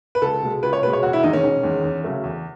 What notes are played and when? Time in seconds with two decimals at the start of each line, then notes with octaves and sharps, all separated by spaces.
0.15 B4
0.22 C#2 A4
0.43 B2 G#3
0.63 C#2 B4
0.73 C#5
0.83 B2 B4
0.87 G#3
0.93 C#5
1.03 E1 F#4
1.13 E4
1.23 E2 D#3 G#3 D#4
1.33 C#4
1.43 E1
1.63 E2 D#3 G#3
1.84 E2
2.04 C#3 F#3 A3
2.24 E2